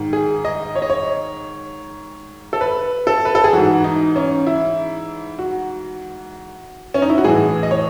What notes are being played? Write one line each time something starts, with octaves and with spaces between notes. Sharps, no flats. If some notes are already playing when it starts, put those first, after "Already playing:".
Already playing: G#2 D#3
G#4
D#5
C#5
D#5
C#5
A4
B4
A4
B4
A4
G#4
G#2 E3 F#4
D#4
C#4
E4
F#4
C#4
D#4
E4
F#4
A2 E3 G#4
D#5
C#5